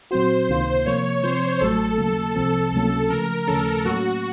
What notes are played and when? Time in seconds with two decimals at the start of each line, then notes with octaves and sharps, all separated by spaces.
0.11 A#2 F#3 C4 F#4 C5
0.49 C#2 C3 D#3 A#3 F4 C5
0.85 C3 F3 A#3 C#5
1.23 C3 F3 C4 C5
1.61 A1 A2 F#3 A3 A4
1.97 D#2 C#3 F#3 A#3
2.36 C2 C3 F3 C4 A4
2.72 C#2 C3 F#3 A#3 C#4 A4
3.09 C#3 F3 A3 A#4
3.47 D#2 C#3 F3 A3 C#4 A4
3.85 A2 F#3 A#3 C#4 F#4